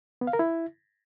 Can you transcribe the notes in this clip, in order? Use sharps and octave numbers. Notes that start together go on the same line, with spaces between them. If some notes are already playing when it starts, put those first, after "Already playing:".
B3
F5
A#4
E4